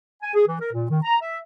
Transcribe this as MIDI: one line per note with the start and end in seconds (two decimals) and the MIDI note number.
0.22 0.30 80
0.34 0.45 68
0.47 0.57 52
0.60 0.70 70
0.73 0.86 46
0.90 0.98 51
1.03 1.16 82
1.22 1.39 76